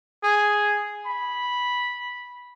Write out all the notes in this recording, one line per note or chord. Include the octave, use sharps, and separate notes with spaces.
G#4
B5